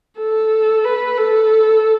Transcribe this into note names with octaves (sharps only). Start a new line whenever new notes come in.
A4
B4
A4